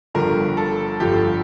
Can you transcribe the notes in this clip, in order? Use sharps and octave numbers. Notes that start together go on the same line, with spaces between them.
G1 G2 D3 F3 A#4
A4
G1 G2 D3 F3 G4